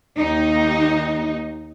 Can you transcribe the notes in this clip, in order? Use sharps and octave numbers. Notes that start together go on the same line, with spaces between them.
D#2 D#4